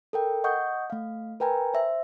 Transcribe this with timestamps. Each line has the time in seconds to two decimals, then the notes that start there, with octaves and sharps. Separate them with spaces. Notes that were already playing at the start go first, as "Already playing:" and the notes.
0.13 A4 A#4 G5
0.44 D#5 F#5 C#6 D#6 G6
0.90 A3 F5
1.40 A#4 B4 G5 G#5 A#5
1.74 C5 E5